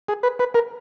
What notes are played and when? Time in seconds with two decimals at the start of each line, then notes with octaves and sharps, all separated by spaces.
0.08 G#4
0.23 B4
0.39 B4
0.54 A#4